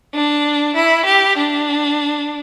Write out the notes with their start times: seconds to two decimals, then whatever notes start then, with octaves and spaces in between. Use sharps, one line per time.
0.13 D4
0.75 E4
1.06 G4
1.38 D4